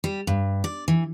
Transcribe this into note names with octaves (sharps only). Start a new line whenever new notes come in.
G3
G2
D5
E3